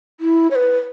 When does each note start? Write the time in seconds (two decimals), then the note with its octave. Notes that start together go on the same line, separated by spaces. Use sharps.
0.20 E4
0.51 C#5
0.55 B4